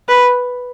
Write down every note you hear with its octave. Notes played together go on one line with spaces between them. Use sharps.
B4